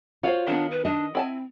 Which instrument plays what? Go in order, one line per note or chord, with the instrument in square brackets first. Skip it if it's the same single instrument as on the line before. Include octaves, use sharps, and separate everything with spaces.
[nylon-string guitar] F4 C#5 F5 [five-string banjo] F#4 C5
[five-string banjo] D#3 B3 [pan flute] D4
[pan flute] B4
[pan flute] D4 [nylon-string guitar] D#5
[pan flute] C4 [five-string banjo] E4 G#5 A5